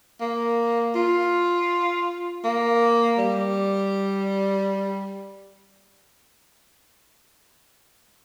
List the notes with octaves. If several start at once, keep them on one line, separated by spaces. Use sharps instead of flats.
A#3
F4
A#3
G3